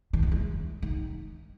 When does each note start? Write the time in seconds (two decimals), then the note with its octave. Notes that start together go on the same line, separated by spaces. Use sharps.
0.13 D#3
0.23 F#2
0.32 E2
0.82 D#3